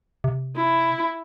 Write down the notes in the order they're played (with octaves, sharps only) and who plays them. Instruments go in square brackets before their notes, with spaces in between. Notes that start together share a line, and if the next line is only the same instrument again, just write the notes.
[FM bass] C3
[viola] E4